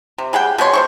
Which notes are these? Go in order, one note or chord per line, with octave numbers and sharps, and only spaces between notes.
C3
G3 G#4 F#5 G5
B2 G#3 C#5 C6
A3 C5 C#6